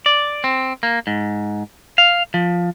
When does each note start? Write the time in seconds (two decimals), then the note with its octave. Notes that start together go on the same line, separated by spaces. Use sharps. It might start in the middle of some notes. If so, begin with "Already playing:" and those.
0.06 D5
0.44 C4
0.83 A#3
1.07 G#2
1.98 F5
2.34 F3